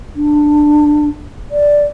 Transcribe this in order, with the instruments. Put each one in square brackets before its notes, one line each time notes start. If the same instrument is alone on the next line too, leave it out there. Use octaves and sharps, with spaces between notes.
[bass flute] D4
D5